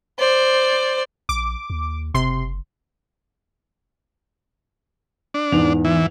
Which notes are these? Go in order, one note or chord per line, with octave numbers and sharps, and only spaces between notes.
C5 D5
A#1 D6
D#2
F#1 C3 C6
D4
E2 G#2 F7
E3